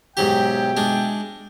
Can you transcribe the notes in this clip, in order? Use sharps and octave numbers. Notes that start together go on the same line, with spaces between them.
G#2 B2 F#3 G4 E5 G5
G#3 D4